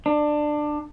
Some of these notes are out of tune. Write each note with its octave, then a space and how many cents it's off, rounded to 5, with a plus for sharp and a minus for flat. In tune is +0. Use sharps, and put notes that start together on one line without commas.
D4 +20